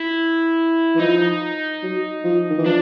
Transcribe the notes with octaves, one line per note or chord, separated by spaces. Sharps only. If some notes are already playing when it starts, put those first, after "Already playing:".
Already playing: E4
E3
F3 D#4
F#3
F3
D#3
E3
F3 D4